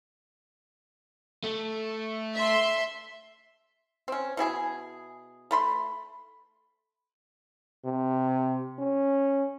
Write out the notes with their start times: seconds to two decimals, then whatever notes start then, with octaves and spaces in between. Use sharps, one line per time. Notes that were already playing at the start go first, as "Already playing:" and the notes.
1.44 A3
2.37 E5 C6
4.08 C4 C#4
4.37 B2 E4 G#4 G#5
5.51 A3 B5 C6
7.85 C3
8.79 C#4